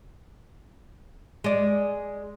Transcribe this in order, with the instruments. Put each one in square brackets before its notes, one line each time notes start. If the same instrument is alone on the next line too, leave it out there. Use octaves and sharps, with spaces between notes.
[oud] G#3 D5